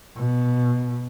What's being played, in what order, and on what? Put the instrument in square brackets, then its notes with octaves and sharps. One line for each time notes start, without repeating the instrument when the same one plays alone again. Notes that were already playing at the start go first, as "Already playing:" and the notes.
[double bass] B2